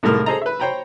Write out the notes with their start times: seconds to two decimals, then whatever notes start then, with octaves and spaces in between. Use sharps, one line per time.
0.03 C2 A2 G#3 A3 A#4 F6
0.26 G#4 A4 C5 D#5 A#5
0.42 B4 E5
0.60 C5 C#5 G5 A#5 B5